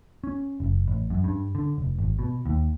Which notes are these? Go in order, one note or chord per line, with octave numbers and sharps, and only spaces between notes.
C#4
F#1
A1
F#2
G2
D3
F1
G#1
B2
D#2